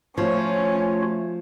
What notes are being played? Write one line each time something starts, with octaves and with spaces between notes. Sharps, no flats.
F3 A3 C#4 F4 F#4 C#5